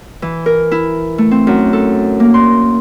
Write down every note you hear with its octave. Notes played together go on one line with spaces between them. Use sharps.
E3
A#4
E4
A3
C4
F#2
A4
A#3
C6